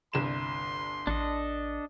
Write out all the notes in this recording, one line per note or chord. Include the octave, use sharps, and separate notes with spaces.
G1 C2 C6 E7
A1 D4 A4 D#5